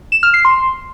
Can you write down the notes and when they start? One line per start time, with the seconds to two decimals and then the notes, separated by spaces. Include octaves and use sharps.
0.12 E7
0.23 F6
0.34 C7
0.45 C6